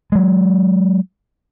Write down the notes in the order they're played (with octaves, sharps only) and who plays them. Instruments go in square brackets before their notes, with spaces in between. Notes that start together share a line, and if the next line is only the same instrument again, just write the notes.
[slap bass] F#3 G#3